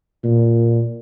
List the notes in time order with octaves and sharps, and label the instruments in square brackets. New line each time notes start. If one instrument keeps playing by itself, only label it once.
[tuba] A#2